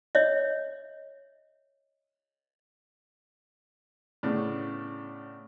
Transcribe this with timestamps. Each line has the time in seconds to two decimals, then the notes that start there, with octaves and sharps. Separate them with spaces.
0.15 C#5 D#5 E5
4.23 A2 C#3 B3 D4